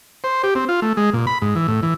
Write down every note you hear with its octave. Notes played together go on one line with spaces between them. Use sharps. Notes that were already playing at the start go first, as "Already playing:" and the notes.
C5
G4
C4
F4
A3
G#3
A#2
B5
G#2
E3
A2
E3